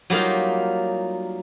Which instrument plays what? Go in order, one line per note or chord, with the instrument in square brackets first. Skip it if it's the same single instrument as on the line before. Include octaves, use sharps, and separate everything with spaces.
[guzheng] F#3 G3 A#3 D#4 F4